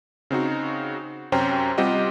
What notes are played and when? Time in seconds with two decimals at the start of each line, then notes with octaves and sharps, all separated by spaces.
0.31 C#3 C4 D#4 F#4
1.32 F#2 C3 C#4 C5 G5 A#5
1.78 G3 C4 F4 G4 D#5 F#5